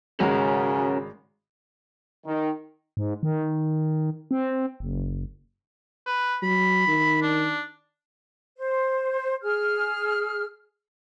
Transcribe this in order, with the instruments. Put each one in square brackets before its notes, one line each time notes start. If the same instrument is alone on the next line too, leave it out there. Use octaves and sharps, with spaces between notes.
[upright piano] G#1 G#3 [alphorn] C#3 [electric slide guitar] C#4 F#4 A#4
[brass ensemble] D#3
[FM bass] G#2
D#3
C4
F#1
[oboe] B4
[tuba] F#3 [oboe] B5
[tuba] D#3
[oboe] D4
[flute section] C5
G#4 F6